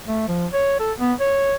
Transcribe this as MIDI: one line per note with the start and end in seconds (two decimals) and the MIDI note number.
0.06 0.25 57
0.28 0.46 53
0.54 0.76 73
0.80 0.92 69
1.00 1.13 59
1.21 1.54 73